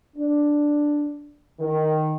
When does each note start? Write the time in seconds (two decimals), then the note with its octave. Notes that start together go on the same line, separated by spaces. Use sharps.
0.15 D4
1.60 D#3